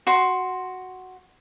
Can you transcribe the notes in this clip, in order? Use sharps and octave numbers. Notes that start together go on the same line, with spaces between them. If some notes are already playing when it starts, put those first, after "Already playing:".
F#4 C6